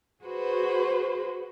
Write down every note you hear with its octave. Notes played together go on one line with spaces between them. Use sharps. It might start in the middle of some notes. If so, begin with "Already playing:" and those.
F#4 G#4 B4 C5